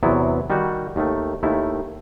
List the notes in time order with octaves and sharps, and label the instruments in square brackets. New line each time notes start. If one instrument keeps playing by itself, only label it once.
[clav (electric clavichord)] E2 C3 F#3 B3 E4
D#3 G3 D#4 F#4
D#2 D#3 A3
D#2 D#3 A3 E4